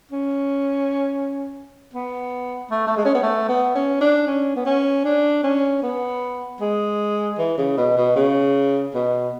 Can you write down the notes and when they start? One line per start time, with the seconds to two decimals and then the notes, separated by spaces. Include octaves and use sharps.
0.11 C#4
1.93 B3
2.71 A3
2.87 A3
2.97 G#3
3.05 C#4
3.15 B3
3.23 A3
3.49 B3
3.75 C#4
4.01 D4
4.27 C#4
4.56 B3
4.66 C#4
5.04 D4
5.43 C#4
5.83 B3
6.61 G#3
7.38 E3
7.58 C#3
7.77 B2
7.97 B2
8.16 C#3
8.94 B2